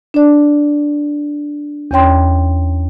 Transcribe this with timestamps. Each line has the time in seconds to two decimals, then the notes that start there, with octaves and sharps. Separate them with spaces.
0.14 D4 D5
1.91 E2 C#4 C#5 G5 C6